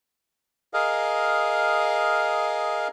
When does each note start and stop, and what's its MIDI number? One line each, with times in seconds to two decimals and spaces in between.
0.74 2.88 68
0.74 2.88 70
0.74 2.88 75
0.74 2.88 77